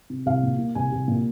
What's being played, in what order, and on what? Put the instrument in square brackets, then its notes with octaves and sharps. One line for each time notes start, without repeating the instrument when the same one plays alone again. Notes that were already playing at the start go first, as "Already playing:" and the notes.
[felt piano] C3
C2 F5
A#2
A#3
C2 G#5
C2
A#2